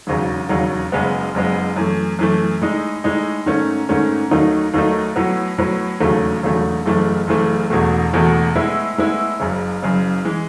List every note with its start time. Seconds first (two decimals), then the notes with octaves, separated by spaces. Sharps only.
0.07 E1 D#2 C#3 F#3
0.49 E1 D#2 C#3 F#3
0.92 F#1 F#2 C#3 G#3 B3
1.34 F#1 F#2 C#3 G#3 B3
1.76 F#2 E3 A3
2.19 F#2 E3 A3
2.62 A2 G#3 D#4
3.04 A2 G#3 D#4
3.46 G#2 D#3 A3 C#4
3.89 G#2 D#3 A3 C#4
4.31 D#2 D#3 F#3 A3 D#4
4.74 D#2 D#3 F#3 A3 D#4
5.16 A2 F#3 B3
5.58 A2 F#3 B3
6.00 E1 D#2 C#3 F#3 A3
6.43 E1 D#2 C#3 F#3 A3
6.86 F#1 F#2 E3 A3
7.28 F#1 F#2 E3 A3
7.70 E1 E2 B2 A3
8.13 E1 E2 B2 A3
8.55 A2 G#3 B3 E4
8.98 A2 G#3 B3 E4
9.40 F#1 F#2 C#3
9.82 F#1 F#2 C#3
10.25 E3 G#3